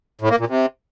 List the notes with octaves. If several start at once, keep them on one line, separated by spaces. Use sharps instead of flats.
A2
A#3
A#2
C3